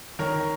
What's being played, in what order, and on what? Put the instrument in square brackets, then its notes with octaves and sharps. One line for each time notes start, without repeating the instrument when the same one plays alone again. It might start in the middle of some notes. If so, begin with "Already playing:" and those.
[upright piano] D#3 A#4 C#5